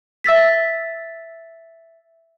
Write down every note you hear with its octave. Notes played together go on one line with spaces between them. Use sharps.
E5 E6 A6 B6